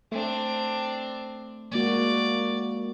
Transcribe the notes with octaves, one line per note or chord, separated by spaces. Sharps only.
A3 C4 D4
G#3 A#3 F#4 D5